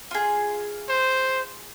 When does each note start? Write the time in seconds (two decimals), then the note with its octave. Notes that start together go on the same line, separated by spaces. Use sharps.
0.11 F4 G#4
0.89 C5